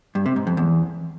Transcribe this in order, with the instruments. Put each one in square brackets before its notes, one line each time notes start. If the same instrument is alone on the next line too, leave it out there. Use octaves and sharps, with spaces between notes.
[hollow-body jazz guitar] G2
C3
G#2
F2
E2